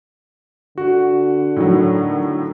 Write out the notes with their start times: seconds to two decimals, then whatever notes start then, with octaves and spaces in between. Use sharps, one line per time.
0.78 D3 F#4
1.56 A2 D#3 F#3